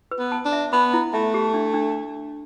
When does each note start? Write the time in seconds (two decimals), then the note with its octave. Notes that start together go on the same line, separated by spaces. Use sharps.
0.11 B4
0.19 B3
0.32 A5
0.45 D4
0.52 E5
0.73 B3 B5
0.93 E4
1.13 A3 E5
1.34 G4
1.54 D4
1.74 D4